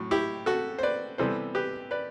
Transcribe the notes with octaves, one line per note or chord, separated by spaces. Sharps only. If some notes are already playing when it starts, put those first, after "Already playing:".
Already playing: A2 F#3
E4 G4
F#4 A4
C5
B4 D5
C3 E3 G3 B3 A4 C5
G4 B4
B4 D5